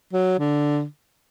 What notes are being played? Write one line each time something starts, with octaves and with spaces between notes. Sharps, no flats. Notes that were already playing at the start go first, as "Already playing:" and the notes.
F#3
D3